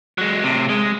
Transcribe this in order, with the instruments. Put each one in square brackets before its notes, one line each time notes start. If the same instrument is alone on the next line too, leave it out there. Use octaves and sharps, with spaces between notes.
[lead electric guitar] F#3 G#3
A2 C3
G#3